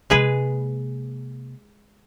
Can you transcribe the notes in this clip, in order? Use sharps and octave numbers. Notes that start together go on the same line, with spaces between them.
C3 G#3 A#3 G#4 B4